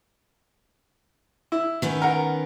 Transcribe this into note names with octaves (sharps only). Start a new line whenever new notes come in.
E4
D#3 B3 C#4
A#4 F#5